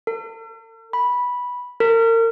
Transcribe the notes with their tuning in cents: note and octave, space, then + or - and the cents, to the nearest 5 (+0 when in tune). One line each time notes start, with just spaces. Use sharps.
A4 +45
B5 -10
A#4 -35